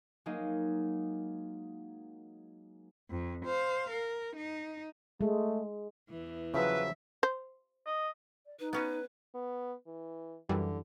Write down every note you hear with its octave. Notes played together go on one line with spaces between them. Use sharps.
F#3 G#3 A#3 D#4
F2
C5 F5
A#4
D#4
G#3 A3
E2 E3
C#3 F3 F#3 B4 E5
C5
D#5
D5
D#4 B4
B3 C#4 F#4 B4
B3
E3
F#2 D3 E3 G3